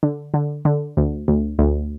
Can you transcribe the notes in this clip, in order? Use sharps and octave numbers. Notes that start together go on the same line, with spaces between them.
D3
D3
D3
D2
D2
D2